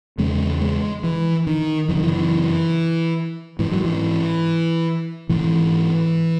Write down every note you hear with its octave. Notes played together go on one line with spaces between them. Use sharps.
E2 C#3 G#3
G#3
E3
D#3
F#2 C#3 E3
D#3
E3
G#2 E3
F#3
E3
G#2 E3